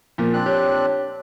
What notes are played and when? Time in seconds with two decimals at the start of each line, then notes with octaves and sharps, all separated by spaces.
0.18 A#2 F3 A#3
0.33 C4 D4 F#6
0.46 G4 C#5